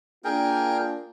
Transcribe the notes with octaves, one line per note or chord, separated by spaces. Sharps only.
A#3 D4 F4 G#4 A#4 G5